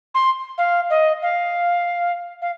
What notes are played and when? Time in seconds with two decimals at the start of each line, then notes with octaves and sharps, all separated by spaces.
0.15 C6
0.58 F5
0.90 D#5
1.22 F5
2.42 F5